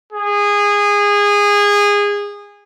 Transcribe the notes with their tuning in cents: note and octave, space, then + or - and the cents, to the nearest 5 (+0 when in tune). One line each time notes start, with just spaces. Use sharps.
G#4 -20